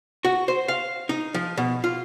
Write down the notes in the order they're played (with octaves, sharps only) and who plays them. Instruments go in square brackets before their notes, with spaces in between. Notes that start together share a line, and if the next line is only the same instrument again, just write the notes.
[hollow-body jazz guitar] F#4
C5
F5
D#4
F3
B2
F4